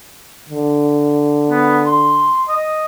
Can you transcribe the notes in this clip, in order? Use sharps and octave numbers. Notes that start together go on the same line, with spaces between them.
D3
B3
C6
D#5